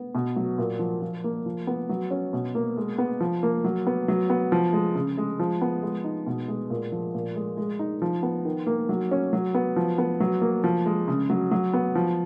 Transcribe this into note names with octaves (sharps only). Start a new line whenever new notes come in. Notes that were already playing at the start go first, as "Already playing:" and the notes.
Already playing: B3
B2
F#3
A#2
F3
F3
A#3
F3
B3
F#3
C#4
B2
A#3
G#3
B3
F3
A#3
F#3
B3
F#3
B3
F3
G#3
C#3
G#3
F3
B3
G#3
D#4
B2
G#3
A#2
F3
A#2
G#3
G#3
D#4
F3
B3
D#3
A#3
F#3
C#4
F#3
B3
F3
B3
F#3
A#3
F3
G#3
C#3
F#3
F#3
B3
F3